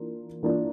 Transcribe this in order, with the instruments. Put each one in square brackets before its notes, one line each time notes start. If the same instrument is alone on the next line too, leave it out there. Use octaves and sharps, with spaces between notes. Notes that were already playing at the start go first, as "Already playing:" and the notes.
Already playing: [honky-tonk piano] E3 A#3 D4 F4
E3 A#3 D4 F4